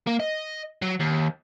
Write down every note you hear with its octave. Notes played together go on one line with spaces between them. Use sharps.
A#3
D#5
F#3
D#2